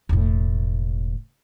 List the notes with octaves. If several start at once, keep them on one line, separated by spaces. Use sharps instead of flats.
E1 A2